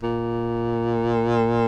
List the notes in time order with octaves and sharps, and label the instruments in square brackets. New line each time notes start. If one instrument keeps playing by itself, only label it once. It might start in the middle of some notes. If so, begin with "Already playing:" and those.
[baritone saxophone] A#2